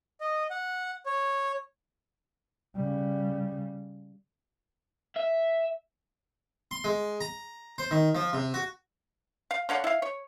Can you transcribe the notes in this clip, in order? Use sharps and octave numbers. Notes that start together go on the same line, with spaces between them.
D#5
F#5
C#5
C#3 G3
E5
C6
G#3
A#5
C5
D#3
F3
C3
F#4
F5
D3 C#5 F5 F#5
E4 F5
C#5